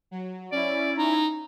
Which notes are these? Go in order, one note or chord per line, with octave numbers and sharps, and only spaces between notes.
F#3
C#4 E4 D5
D#4